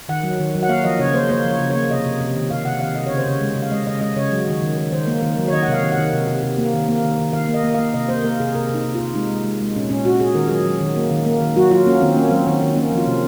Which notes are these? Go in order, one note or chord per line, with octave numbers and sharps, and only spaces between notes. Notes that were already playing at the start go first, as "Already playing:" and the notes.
D#3 F#5
F#3
D#3
F#3
F#5
A#3 F5
F3 D#5
C#3 C#5
A#3 C5
A#3 C5
F3 C#5
C#3
C#5
A#3
C3 D#5
C3
C3
D#3
C3 F5
C3 F#5
D#3 F5
C3 D#5
C#3 C#5
C5
C#3 C#5
G#3
C#3
F5
G#3 D#5
C#3 D#5
G#3 D#5
C#3 C#5
F#3
D#3
D#3
D#3
D#3 C5
A#3
D#3
F#3
C#5
D#3 D#5
F#5
C3 F5
D#3
F#5
D#3
C3
C3
C3
A#3
D#3
A#3
D#3
D#3
D#3 F5
A#3
D#5
A#3
A#3 F5
C3 D#5
A#3 C5
A#3 A#4
C3 G#4
C3 A#4
C3
D#4
C3
F4
C3
G#3 D#4
G#3
G#3
G#3
A#2 C#4
A#2 C#4
A#2 F#4
A#2 G#4
D#3 A#4
F#3 G#4
F#3
D#3
A#3
D#3
A#3
D#3
F#3 F#4
F#3 F4
A#3 C#4
D#3 C4
A#3 C#4
F#3 C4
C#4
D#3 C4
D#3
A#3 C#4
F3
F4
C3